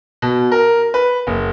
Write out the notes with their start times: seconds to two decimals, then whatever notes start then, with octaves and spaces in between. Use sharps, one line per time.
0.22 B2
0.52 A#4
0.94 B4
1.27 F#1